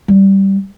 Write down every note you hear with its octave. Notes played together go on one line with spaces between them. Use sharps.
G3